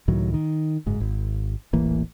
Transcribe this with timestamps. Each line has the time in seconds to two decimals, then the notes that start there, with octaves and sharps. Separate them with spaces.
0.08 C#2 A2 D#3 F#3
0.34 D#3
0.86 F#1 G#2
1.00 G#1
1.73 D#1 A1 E3 A#3